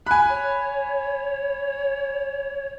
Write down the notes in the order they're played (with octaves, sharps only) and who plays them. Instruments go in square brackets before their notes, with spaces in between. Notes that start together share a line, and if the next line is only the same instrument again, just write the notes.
[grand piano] G#5 B5 [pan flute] F#6
[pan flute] C#5